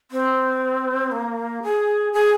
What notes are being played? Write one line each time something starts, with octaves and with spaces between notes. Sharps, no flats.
C4
A#3
G#4
G#4